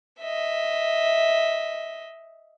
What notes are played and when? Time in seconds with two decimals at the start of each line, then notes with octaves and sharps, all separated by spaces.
0.20 D#5 E5